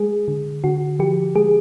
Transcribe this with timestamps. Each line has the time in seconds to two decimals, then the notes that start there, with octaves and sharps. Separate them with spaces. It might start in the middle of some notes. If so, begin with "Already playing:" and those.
Already playing: G#3 G#4
0.28 D3
0.64 D3 F#4
0.99 F3 G4
1.35 G#3 G#4